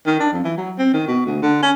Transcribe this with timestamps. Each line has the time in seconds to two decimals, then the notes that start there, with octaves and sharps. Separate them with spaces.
0.06 D#3
0.20 D4
0.32 F2
0.44 E3
0.57 F#3
0.78 C4
0.93 D#3
1.08 B2
1.26 D2
1.42 D3
1.62 C#4